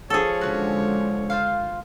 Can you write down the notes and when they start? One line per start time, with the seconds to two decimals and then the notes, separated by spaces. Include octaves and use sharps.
0.10 F3 G#4 A4 C#5
0.41 D3 G#3 C#4 F#4
1.30 F4 C5 F5